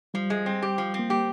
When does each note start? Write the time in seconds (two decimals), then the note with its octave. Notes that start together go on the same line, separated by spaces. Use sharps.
0.14 F3 G3
0.30 G#3
0.46 C4
0.62 G4
0.78 F3
0.94 C4
0.99 A#3
1.10 G4